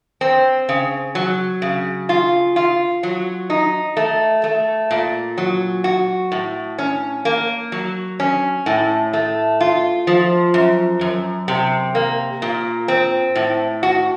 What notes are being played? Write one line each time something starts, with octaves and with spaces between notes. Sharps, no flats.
C4
C#3
F#3
C#3
F4
F4
F#3
D#4
A3
A3
A#2
F#3
F#4
A2
C#4
A#3
F#3
C#4
A2
A3
F4
F3
F#2
F#2
C3
A#3
A#2
C4
A2
F#4